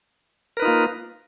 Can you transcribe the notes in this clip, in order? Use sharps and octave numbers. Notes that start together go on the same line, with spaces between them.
A#3 D#4 F4 A#4 B4